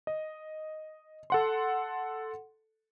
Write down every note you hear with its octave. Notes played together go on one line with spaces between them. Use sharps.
D#5
A4 F#5 C6